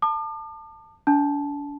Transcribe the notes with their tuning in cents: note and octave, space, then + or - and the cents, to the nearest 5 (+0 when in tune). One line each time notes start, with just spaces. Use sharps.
A5 +15 D6 +45
D4 -40 A5 -15